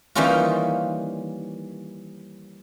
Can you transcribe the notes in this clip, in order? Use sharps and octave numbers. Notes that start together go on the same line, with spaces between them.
D#3 E3 G3 A#3 C#4 F4